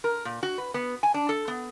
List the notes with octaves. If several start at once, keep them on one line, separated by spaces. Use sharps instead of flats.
A#4
A#2
F#4
B4
B3
G#5
D4
A4
B3